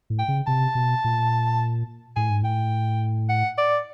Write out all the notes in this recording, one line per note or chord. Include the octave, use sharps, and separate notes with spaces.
A2
G5
C#3
C3 A5
B2
A#2
A2 G#5
G#2
A2 G5
F#5
D5